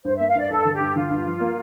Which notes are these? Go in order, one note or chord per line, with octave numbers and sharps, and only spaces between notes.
G2 C5
A#3 E5
F5
G2 D5
G2 A4
D3
G4
G2
D3 F4
G2
F3
A#3